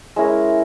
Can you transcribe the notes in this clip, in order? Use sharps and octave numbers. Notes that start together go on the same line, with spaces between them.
G#3 C#4 E4 A#4